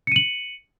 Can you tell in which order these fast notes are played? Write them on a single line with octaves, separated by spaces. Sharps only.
C#7 D#7 F#7